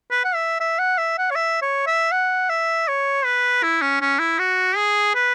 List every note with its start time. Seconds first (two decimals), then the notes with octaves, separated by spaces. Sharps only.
0.11 B4
0.24 F#5
0.35 E5
0.60 E5
0.79 F#5
0.98 E5
1.18 F#5
1.31 C#5
1.36 E5
1.62 C#5
1.87 E5
2.12 F#5
2.50 E5
2.88 C#5
3.25 B4
3.63 E4
3.82 C#4
4.01 C#4
4.19 E4
4.39 F#4
4.77 G#4
5.15 B4